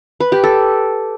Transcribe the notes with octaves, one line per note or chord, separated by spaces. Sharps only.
B4
G4
A4